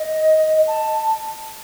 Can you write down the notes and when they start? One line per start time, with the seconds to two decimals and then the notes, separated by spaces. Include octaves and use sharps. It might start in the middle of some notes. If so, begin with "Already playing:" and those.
Already playing: D#5
0.67 A5